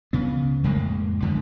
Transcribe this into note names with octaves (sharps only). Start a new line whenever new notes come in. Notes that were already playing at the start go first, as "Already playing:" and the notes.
C#2 C#3 B3
F2 A2 G#3 A#3
F#2 D3 G#3